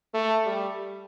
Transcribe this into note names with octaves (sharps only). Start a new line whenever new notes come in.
A3
G3